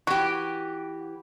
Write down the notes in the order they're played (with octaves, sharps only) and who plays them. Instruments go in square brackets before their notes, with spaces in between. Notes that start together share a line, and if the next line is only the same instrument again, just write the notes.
[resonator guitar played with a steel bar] E3 G4 [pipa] F#4